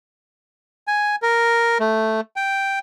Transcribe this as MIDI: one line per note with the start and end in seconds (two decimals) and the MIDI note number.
0.87 1.16 80
1.22 1.78 70
1.80 2.21 57
2.36 2.79 79